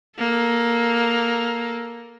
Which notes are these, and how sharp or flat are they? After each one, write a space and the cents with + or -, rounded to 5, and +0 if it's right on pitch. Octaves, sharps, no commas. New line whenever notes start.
A#3 +10 A4 +0